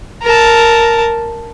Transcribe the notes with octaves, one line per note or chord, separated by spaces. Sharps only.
A#4 A5